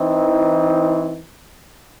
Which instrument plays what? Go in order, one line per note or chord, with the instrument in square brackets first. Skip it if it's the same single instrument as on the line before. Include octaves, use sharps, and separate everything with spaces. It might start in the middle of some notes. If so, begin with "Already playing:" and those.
Already playing: [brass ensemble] E3 C4 D#4